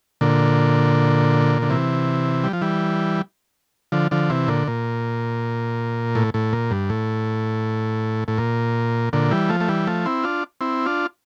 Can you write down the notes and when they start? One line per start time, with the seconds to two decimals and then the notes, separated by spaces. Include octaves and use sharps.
0.21 A#2 D3
1.62 D3
1.69 C3 E3
2.44 G3
2.53 F3
2.61 E3 G3
3.92 D3 F3
4.11 D3 F3
4.30 C3 E3
4.48 A#2 D3
4.67 A#2
6.15 A2
6.34 A2
6.53 A#2
6.71 G2
6.90 A2
8.28 A2
8.38 A#2
9.13 A#2 D3
9.31 E3 G3
9.49 F3 A3
9.60 A3
9.68 E3 G3
9.87 F3 A3
10.06 C4 E4
10.24 D4 F4
10.61 C4 E4
10.86 D4 F4